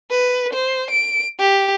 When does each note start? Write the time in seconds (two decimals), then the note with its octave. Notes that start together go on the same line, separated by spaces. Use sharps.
0.11 B4
0.54 C5
0.91 D7
1.40 G4